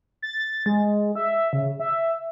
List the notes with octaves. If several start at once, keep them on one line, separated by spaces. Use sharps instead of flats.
A6
G#3
E5
C#3
E5